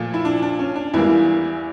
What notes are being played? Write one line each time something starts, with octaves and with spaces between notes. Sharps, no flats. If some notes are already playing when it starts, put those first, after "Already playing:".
Already playing: A#2 F3 A3
E4
D4
D4
C#4
D4
E2 E3 G3 A#3 E4